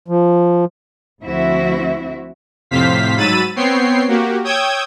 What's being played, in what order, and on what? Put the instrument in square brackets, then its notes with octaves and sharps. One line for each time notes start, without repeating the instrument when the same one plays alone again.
[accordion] F3
[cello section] D2 F3 C4 E4 F#4 E5
[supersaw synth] F2 A2 C3 C5 F5 B6
G#2 F#3 B5 E6 A6 D#7
B3 C4 C#5 G5 C7
A#3 F#4 G4
C#5 G5 D#6 E6 G6 G#6